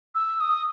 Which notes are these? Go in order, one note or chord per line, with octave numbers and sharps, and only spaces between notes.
E6
D#6